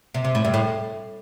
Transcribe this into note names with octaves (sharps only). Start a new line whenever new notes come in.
C3
C3
A2
G2
A2